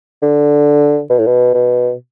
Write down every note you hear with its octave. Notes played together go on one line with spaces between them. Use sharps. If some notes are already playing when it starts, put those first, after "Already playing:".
D3
B2
A2
B2
B2